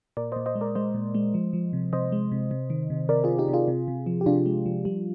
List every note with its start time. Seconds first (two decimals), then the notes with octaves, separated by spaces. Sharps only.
0.17 A#2 A#4 D5
0.32 A#2 C5 D#5
0.46 C5 D#5
0.55 G#3
0.61 A#4 D5
0.75 G#3 C5 D#5
0.94 A#2
1.15 G#3
1.34 F3
1.53 F3
1.73 C3
1.93 C3 C5 D#5
2.12 G#3
2.32 C3
2.51 C3
2.70 D#3
2.90 C3
3.09 C3 A#4 D5
3.24 C3 F4 G#4
3.39 D#4 G4
3.48 C3
3.53 F4 G#4
3.68 C3
3.88 C3
4.06 F3
4.21 G4
4.26 C3 D4 F4
4.46 G#3
4.66 F3
4.85 G3